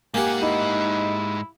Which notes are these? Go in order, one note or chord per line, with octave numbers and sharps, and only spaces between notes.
G#2 A#3 G4 F#5 G#5
D#4 E4